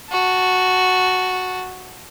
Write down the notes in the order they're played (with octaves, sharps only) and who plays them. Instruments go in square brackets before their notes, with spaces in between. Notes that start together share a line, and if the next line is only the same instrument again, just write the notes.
[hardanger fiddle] F#4 A5